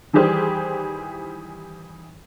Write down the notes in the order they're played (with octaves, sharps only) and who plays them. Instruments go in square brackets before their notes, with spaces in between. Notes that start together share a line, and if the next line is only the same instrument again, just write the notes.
[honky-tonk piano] D#3 E3 G3 G4 G#4 C5